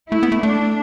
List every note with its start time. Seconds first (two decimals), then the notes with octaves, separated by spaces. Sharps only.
0.12 A3 E4
0.23 B3
0.32 A3
0.43 A3 D4